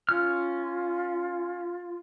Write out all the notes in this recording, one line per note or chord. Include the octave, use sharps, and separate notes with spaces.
C#4 F4 F6